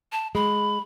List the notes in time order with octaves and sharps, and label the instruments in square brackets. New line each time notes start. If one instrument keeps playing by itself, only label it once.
[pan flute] A5
[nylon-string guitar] G#3 [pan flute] B5